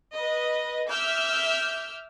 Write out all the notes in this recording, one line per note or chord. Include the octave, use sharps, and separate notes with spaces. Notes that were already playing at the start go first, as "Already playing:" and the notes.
B4 D#5
E5 D6 E6 F6 G6